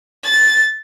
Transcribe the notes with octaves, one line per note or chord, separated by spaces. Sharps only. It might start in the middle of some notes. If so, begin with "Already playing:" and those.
A6